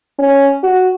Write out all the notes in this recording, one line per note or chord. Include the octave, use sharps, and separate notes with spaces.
C#4
F#4